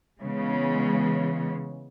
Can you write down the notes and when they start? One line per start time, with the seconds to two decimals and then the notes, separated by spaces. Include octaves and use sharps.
0.20 C#3 E3 G#3 B3